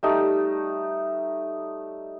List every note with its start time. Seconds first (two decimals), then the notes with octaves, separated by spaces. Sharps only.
0.03 G3 A3 D#4